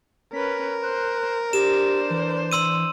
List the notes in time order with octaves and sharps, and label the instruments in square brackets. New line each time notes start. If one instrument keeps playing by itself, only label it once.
[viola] C#4 B4 [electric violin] A#4 [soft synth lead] B6
[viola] C5 [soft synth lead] F#6
[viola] D4 C5 [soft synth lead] G4 [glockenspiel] E7
[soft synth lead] E3
[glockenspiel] C6 E6 D#7